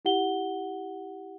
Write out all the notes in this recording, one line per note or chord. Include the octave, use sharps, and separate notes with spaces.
E4 G4 F#5 G7